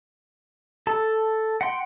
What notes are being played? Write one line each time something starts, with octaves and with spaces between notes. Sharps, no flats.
A4 A5
F#5 G5 C6